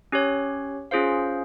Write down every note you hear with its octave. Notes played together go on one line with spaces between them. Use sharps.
C#4 G4 C#5
C#4 F4 G#4 C5 F5